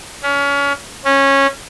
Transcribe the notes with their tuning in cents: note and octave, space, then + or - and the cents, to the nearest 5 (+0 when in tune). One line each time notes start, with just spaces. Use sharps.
C#4 +30
C#4 -15